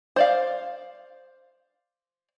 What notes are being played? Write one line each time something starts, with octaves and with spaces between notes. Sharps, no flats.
C5 D5 F5